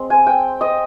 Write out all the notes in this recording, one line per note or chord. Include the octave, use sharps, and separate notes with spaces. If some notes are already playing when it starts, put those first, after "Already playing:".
Already playing: G#3 C4
G#5
G5
D#5